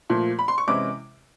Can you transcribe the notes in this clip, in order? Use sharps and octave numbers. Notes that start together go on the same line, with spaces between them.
A#2 F3 A3
B5
C6
C#6
C3 E3 G#3 C#4 E4 D6